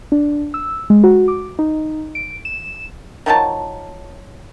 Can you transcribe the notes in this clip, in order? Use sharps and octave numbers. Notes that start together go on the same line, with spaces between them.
D4
E6
G#3
F#4
D6
D#4
D7
E7
D#3 F3 F#3 A5